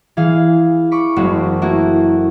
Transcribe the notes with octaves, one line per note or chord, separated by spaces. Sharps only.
E3 G#4 F5
B5 C#6 D6
F#1 G#3 A3 C4 F#4
A3 A#3 E4 F#4